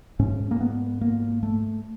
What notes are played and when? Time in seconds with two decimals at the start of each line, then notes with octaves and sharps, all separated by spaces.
0.19 G#2 C#4
0.51 A#3
0.60 B3
1.01 A#3
1.43 A3